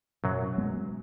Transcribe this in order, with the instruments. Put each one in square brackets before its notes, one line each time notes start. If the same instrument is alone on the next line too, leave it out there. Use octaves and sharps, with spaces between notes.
[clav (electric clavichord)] F#2 F#3 [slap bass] B2
[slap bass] G#3 B3